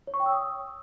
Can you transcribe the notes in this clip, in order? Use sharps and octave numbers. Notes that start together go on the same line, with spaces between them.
C#5
C#6
G5
E6
D#6